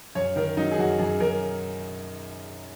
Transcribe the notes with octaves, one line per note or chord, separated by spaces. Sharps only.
F#2 C#5
D#3 A#4
F#3 D#4
G#4
F#2 F#4
F#2 G#4
F#2 A#4